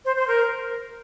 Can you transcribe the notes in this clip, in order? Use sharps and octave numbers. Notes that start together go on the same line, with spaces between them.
C5
C5
A#4